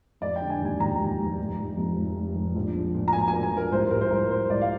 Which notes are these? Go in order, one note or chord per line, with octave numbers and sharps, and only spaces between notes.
F1 D5
G5
D3
G#5
D#2 G#5
D#2 A#5
D#2
F1
F1
F1
F2
F1
F1
F1
A#1
F3
A#2
A#5
A#2 G#5
G#5
A#3
G#5
F3 A#4
C2 C5
C2 A#4
C5
C2 A#4
C2 C5
C2 D5
F5